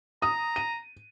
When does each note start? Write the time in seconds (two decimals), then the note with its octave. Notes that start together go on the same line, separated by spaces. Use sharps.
0.22 A#5 D#6
0.56 D#7